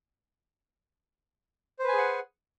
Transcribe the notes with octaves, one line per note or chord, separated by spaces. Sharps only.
G#4 B4 C5 F#5 G#5